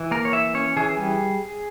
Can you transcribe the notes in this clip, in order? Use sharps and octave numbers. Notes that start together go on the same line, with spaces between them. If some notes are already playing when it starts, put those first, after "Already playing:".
Already playing: E3
A#3 A#4
C#5
E3 E5
C#4 C#5
E3 G#4
G3